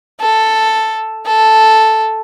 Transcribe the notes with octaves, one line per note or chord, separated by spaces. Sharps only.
A4
A4